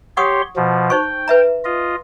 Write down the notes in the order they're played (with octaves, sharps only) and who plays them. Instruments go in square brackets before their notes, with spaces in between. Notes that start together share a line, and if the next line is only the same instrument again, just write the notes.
[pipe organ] G4 C#5 C6 [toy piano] F#5 C#6 D#6
[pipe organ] B2 F3
[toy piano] D#4 C5 C#6 [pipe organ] G5
[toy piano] B4 E5 A#5
[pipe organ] F4 D#5